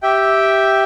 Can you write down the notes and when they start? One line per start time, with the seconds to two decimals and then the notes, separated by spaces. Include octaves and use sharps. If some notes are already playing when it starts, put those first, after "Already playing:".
0.02 G4 E5 G5